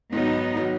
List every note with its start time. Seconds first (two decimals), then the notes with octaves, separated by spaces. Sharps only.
0.12 G#2 D#3 F#3 B3 D#4
0.56 D#3 F#3